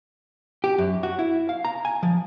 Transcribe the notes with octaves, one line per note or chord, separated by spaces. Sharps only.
G4
F#2
F#4
E4
F5
A#5
G#5
F3